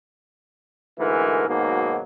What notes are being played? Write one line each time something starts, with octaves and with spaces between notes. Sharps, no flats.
D2 G#2 E3 A#4
G#2 B2 D#3 F#3 A#3